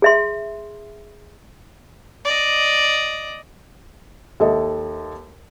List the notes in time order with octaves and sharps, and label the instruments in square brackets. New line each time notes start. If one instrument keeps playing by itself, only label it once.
[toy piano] G#4 E5 C6
[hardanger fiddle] D5 D#5
[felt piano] D#2 A4 D#5 E5